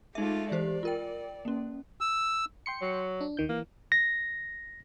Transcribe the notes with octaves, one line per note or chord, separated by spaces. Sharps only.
G#3 A3 D#4 F4 E5
E3 G4 C5 D5
F4 A#4 G5
A#3 C#4
E6
G5 C6 C#7
F#3
D4
D#2 D#3 G6
E3 A#3
A#6